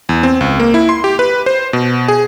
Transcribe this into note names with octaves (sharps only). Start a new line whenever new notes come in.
E2
C4
C#2
A#3
E4
C6
G4
B4
C5
B2
G#4